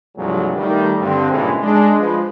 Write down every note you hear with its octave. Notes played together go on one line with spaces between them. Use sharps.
C2 G2 F3 F#3 A3 G#4
D#3 G3 A3
G2 D3 C4
G2 A#2 C#3 E3 G#3
G#3 D4
F3 G#3 B4